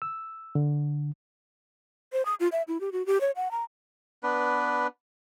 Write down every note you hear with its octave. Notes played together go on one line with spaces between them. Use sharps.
E6
D3
C5
D#6
F4
E5
E4
G4
F#4
G4
C#5
F#5
A#5
B3 D4 B4